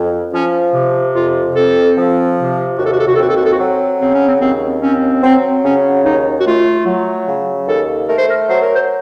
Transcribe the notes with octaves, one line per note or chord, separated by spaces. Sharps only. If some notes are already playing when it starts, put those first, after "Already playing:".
Already playing: F2
F3 C#4
C3
F2 F4
C4 A4
F3
C3
D#2 F#4
A4
F#4
A4
F#4
A4
C4 F#4
A4
F#4
A4
F#4
F#3
C#3 C4
C#4
C4
D#2 C4
C4 C#4
F#3 C4
C#3 C#4
D#2 D#4
F#4
A3 F4
F#3
C#3
D#2 A4
A3 A#4
C5
A#4
F#3 C5
A#4
C5